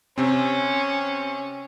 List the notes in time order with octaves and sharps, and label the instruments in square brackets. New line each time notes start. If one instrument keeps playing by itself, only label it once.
[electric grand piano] C3 C4 [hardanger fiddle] C#4